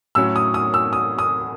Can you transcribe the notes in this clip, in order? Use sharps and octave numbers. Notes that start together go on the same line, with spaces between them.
A2 F#3 C#4 E6
D#6
D#6
E6
D#6
D#6